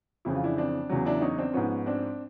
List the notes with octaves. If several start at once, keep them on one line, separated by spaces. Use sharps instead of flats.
F2 C#3 E3 E4
F4
D4 E4
C4 D4
E2 C#3 F#3
D4 E4
C#4 D#4
C4 D4
G#2 F3 B3 C#4
C4 D4